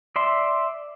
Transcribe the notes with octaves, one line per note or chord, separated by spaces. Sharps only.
D5 E5 C6